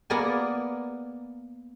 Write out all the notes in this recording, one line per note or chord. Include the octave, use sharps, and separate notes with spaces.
A#3 B3 A#4 D5 G#5